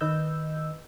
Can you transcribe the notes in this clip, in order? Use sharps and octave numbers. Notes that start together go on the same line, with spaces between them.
D#3 B4 D#5 E6 G6